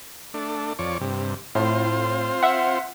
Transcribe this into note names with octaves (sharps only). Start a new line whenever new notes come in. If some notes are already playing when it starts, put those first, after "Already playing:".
A3 D4
F2 C#5 D5
G2 C3
A2 C4 F4 C5
E5 F#5